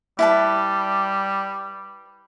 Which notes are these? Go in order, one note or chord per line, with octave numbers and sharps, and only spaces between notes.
G3 E4 B4 A5